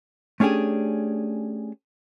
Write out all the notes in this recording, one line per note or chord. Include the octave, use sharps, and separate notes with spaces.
A3 C#4 D4 G4 G#4